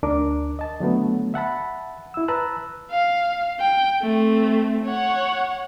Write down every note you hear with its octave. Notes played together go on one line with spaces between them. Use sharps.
D2 D4 A#4 D6
D#5 A5
D3 F#3 A3 B3
E5 F#5 A5 B5
E4 E6
B4 A5 A#5 E6 F#6
F5
G5
A3 C4
C#5 F#5